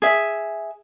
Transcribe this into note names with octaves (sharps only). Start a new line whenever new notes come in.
G#4 E5